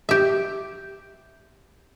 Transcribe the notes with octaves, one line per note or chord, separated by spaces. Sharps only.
G4 E5